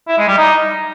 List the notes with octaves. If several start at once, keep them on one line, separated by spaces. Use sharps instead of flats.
E4
G#3
G3
D#4